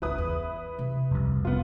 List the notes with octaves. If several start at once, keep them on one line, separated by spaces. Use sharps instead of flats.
G1 C#2 E4 B4 D#6
E2
C3
F1 C2
F#1 B3 F4